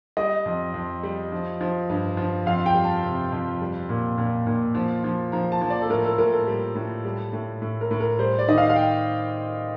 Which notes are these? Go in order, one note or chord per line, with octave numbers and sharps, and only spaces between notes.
G3 D#5
F2
F2
G3
F3
F3
G2
F3
F2 F5
G5
G3
A5
C3
F2
G3
A#2
A#2
A#2
F3
F3
F3 A#5
A5
F3
D5
A4
A2 A#4
A4
A2 A#4
A4
G3
A2
G3
A2
A2
A#4
A2
A#4
G3 C5
D5
D#3 D#5
F5
F5
G5